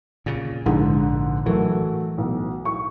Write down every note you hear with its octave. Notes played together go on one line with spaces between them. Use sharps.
A#2 C#3
A#1 G#2 D3
A2 E3 F#3 A3 A#4
B1
C#6